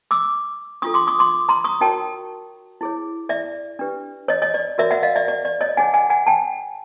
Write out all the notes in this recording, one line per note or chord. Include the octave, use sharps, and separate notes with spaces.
D6 E6
D4 F4 A4 C#6 D#6
C6 D6
C#6 D#6
C6 D6
A#5 C6
C#6 D#6
D#4 F#4 A#4 C#5 G5 A5
E4 G#4 C#5
D5 E5
D4 G4 B4
C#5 D#5
C#5 D#5
D5
F#4 A#4 C#5 D5 E5
E5 F#5
D#5 F5
D5 E5
D5
D5
C#5 D#5
D#4 G#4 C#5 F#5 G#5
F#5 G#5
F#5 G#5
G5 A5